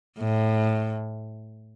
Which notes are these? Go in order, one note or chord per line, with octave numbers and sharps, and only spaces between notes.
A2